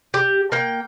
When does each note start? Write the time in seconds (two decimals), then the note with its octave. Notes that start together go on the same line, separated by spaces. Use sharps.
0.14 G4
0.52 A#3 G5